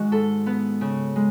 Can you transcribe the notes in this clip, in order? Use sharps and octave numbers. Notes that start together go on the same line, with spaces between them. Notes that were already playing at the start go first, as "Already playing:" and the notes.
Already playing: D#3 G#3 F#4
G#2 A4
B3
C#3
G#3